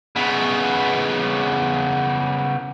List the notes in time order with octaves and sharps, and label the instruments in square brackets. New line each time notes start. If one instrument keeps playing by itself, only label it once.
[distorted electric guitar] C#3 B3